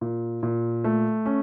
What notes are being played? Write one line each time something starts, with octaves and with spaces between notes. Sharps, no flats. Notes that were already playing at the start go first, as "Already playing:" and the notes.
A#2
A#2
A3
C#4